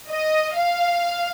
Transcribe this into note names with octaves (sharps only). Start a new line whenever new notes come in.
D#5
F5